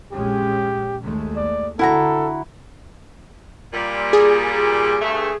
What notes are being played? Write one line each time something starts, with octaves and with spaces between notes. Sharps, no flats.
A#1 G#3 C#4 G4
D#2 G#3 A3
D5
D3 E4 F#4 A4 A#5
A#2 G3
G#4
G2 A3